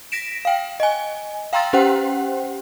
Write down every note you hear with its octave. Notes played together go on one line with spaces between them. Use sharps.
A#6 B6 D7 E7
F5 G5
D#5 G#5
F5 G5 A#5 C6 E6 A6
C#4 G4 C5 F#5 G5